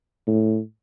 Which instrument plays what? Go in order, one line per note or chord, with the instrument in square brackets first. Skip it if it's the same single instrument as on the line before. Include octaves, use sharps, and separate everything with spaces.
[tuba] A2